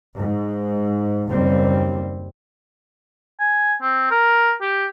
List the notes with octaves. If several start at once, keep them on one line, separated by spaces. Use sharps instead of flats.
G#2
F#1 D#2 G3 C4
G#5
C4
A#4
G4